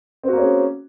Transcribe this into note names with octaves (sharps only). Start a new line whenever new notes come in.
A#3 C4 C#4 F#4 G#4